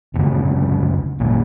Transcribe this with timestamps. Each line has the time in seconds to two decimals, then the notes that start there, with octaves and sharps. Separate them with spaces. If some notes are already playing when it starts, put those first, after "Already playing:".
0.14 F#1 D2 C#3
1.19 G#1 D2 A#2